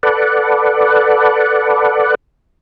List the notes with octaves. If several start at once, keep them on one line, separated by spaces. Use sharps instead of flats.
A4 B4 D5 F#5